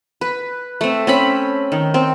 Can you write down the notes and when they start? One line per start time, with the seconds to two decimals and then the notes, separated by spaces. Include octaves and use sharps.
0.21 B4
0.81 A3 C4
1.07 C4 C#4 B5
1.72 D#3
1.94 C4